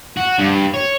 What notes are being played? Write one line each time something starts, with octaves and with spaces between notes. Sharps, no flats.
F#4
G2
C#5